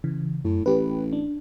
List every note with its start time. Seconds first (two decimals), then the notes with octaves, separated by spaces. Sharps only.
0.04 C#3 E3
0.45 F#2 A2
0.66 A1 G4 B4
1.13 D4